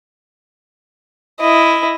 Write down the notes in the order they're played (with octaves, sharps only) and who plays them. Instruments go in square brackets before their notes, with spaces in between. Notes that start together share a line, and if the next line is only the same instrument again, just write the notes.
[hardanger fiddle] E4 D#5